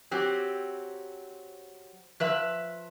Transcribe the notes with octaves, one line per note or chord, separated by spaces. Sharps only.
F#3 C4 G4
F3 B4 E5